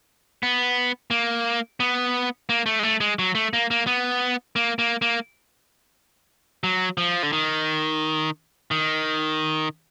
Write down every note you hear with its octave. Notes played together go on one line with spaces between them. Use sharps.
B3
A#3
B3
A#3
A3
G#3
A3
G#3
F#3
A3
A#3
A#3
B3
A#3
A#3
A#3
F#3
F3
D3
D#3
D#3